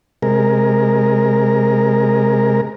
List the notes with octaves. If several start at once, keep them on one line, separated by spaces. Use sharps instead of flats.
C3 G#3 A#4